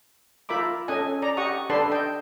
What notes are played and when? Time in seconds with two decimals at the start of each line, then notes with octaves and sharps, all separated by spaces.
0.49 F4 A#4 E5 B5 D6
0.88 C#4 A4 D#5 G#5
1.22 D5 A#5
1.37 G4 D#5 F#5 C#6 D#6
1.70 D4 A4 B4 D5 A5 C6
1.91 D#5 G5